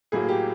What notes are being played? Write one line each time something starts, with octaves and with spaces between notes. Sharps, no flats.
A2 F#3 A#3 G#4
G4